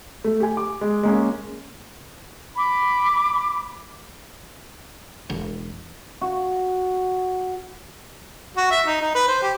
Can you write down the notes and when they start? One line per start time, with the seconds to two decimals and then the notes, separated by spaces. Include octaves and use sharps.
0.24 A3
0.40 G4 G#5
0.57 D6
0.81 G#3
1.03 G#3 A#3 C#4
2.56 B5 D6
5.30 E1
6.21 F#4
8.57 F#4
8.71 E5
8.86 D#4
9.01 D#4
9.15 B4
9.28 C5
9.42 G4